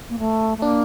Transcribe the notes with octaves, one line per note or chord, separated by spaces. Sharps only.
A#3
A3
A3
A#3 D4